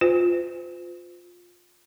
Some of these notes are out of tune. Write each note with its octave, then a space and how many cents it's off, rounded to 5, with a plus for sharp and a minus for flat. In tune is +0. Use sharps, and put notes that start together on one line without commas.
F4 +15 C5 -40